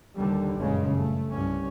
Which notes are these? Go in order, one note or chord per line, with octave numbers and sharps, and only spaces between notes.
D#2 D3 G3
F#1 G2 A#2 C#3 G#3
A3
C2 G2 C#4